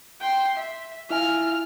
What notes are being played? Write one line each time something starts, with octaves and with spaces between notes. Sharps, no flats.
G5 C6
E5
E4 F4 E5 G#5 F6